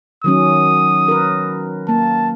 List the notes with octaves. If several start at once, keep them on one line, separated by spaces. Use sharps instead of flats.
D#3 F#3 C#4 D#6
A#4 B4
A#3 A5